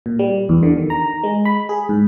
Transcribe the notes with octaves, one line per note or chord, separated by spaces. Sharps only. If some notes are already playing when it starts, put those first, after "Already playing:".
A#2
G3
E2
D3
D#3
A#5
G#3
B5
G#4
G#2